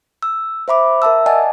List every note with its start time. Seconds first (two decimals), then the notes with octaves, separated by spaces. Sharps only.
0.23 E6
0.68 C5 E5 B5 D6
1.02 A#4 E5 A5 E6
1.26 D5 D#5 F#5 G#5 A5